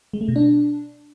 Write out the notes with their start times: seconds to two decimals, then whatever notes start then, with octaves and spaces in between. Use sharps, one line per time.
0.13 G#3
0.21 A3
0.28 B2
0.36 D4